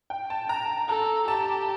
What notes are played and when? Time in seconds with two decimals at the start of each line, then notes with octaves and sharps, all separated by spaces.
0.10 G5
0.30 A5
0.49 A#5
0.89 A4 A#5
1.28 G4 A5